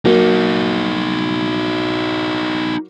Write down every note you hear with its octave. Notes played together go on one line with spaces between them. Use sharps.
F#3 A#3 D#4 F#4